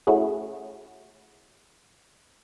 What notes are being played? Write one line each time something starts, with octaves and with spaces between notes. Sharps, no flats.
A3 C#4 E4 F#4 G#4